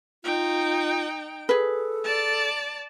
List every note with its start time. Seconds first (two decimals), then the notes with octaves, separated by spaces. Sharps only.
0.24 D#4 F4 G5
1.49 G#4 A4 B4
2.04 D5 A5